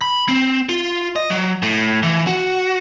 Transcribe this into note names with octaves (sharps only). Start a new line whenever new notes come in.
B5
C4
F4
D#5
F#3
A2
E3
F#4